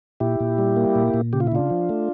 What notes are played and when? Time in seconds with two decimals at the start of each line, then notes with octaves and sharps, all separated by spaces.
0.20 A#2 E4 G4
0.40 A#2
0.58 G3
0.77 A#3
0.95 A#2
1.14 A#2
1.33 C#3 G4
1.40 F4
1.47 E4
1.52 C#3 D4 F4
1.70 F3
1.89 A3